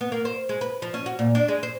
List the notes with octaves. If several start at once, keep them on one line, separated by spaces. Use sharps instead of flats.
B3
A#3
C5
G#3
B4
F3
C#4
F#4
A#2
D4
G#3
C5